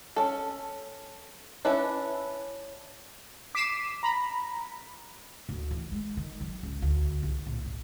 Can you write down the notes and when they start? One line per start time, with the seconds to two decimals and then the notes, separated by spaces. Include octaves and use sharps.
0.16 C#4 A4
1.65 C#4 D4 E4 B4
3.55 D6 B6 C7 D#7 E7
4.03 A#5 B5
5.49 D2
5.71 E3
5.92 G#3
6.17 D#3
6.41 F#3
6.63 C#2
6.82 D2
7.23 C2
7.47 A#1
7.65 G#1